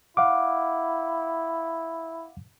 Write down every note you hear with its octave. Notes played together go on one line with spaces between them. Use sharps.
E4 F5 F#5 D6